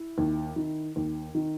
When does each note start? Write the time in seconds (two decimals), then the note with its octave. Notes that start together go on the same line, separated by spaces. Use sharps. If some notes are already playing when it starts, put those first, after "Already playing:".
Already playing: E4
0.18 D#2
0.56 D#3
0.96 D#2
1.35 D#3